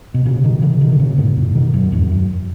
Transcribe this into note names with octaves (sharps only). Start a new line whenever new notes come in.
B2
A#2 C#3
B2 D#3
C#3 E3
B2 D#3
D#3
A#2 C#3
G#2 B2
F#2 A#2
B2 D#3
F#2
E2 G#2
F#2